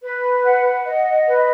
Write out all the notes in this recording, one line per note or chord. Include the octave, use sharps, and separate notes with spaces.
B4
F#5
D#5
B4